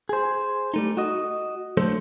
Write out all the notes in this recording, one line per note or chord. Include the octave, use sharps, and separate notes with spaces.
G#4 C5
G3 A3 D#4
F#4 D#5
D3 F#3 A3 A4 C5